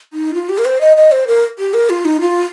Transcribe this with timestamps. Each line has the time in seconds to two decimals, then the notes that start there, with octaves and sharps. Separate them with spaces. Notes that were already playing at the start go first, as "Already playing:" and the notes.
0.13 D#4
0.34 F4
0.49 G4
0.58 A#4
0.65 C5
0.81 D#5
0.97 D#5
1.12 C5
1.27 A#4
1.59 G4
1.74 A#4
1.89 F4
2.05 D#4
2.20 F4